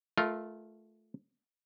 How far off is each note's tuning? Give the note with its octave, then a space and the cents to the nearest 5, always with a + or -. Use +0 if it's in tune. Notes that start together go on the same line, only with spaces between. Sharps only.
A3 -20 F4 +0 A#4 +0